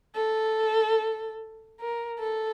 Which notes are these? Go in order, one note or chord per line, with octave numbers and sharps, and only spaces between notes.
A4
A#4
A4